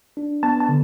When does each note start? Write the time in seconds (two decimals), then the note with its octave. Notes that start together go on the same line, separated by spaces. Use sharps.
0.17 D4
0.43 B3 A5
0.60 A5
0.69 D3